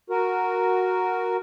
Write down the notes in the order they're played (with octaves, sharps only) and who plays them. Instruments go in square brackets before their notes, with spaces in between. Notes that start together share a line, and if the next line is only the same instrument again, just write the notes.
[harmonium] F#4 A#4